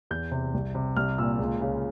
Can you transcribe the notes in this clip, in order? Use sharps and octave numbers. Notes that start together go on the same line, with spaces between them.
E2 G6
C3
C2
C3
C2 F6
A#2 E6
C#2
C#3